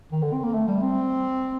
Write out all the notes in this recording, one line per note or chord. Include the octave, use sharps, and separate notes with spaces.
D#3
D3
C4
A#3
A3
G3
C4